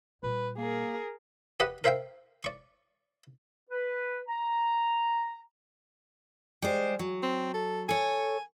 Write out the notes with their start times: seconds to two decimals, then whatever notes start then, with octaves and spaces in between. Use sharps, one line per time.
0.23 A#2 G3 B4
0.58 A#3 G#4 A#4
1.60 G4 B4 D#5 F#5
1.84 A#4 C5 E5 F5 G5
2.44 D5 C#6
3.70 B4
4.28 A#5
6.62 G3 G#3 C5
6.99 F#3
7.23 C4
7.54 A4
7.89 A4 C#5 G#5